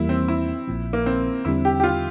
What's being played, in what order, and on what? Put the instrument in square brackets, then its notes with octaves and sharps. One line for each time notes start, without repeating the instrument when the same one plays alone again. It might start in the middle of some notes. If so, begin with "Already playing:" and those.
Already playing: [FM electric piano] E2 E3 G3 A#3 [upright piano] E4
[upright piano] C4
E4
[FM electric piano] A#1 A#2 F3
[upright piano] A#3
C4
[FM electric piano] E2 D3 G3 C4 [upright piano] E4
[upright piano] G4
G4
F4